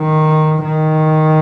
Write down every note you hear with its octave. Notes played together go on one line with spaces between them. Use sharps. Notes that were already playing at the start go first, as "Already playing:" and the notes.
Already playing: D#3
D#3